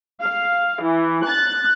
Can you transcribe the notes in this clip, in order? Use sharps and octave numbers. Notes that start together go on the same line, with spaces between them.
F5
E3
F#6 A6